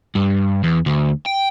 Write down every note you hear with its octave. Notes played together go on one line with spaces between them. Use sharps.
G2
E2
D2
G5